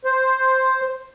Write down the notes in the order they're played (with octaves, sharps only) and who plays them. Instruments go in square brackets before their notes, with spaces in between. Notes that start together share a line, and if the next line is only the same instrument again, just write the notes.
[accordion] C5